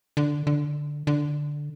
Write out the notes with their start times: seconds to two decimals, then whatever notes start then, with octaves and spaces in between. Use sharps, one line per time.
0.17 D3
0.47 D3
1.07 D3